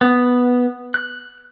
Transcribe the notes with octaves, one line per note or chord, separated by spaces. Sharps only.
B3
F#6